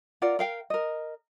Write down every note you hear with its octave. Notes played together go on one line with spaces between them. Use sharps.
F4 A#4 D5 F#5
A#4 F5 G5
A#4 D#5